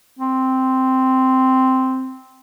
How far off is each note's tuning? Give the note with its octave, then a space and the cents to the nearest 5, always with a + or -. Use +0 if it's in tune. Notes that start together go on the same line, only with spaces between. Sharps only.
C4 -5